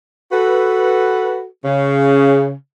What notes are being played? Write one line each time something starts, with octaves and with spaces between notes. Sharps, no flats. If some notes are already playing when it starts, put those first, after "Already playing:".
F#4 A4 B4
C#3